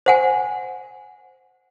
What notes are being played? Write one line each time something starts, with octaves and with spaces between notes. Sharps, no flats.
C5 F#5 G#5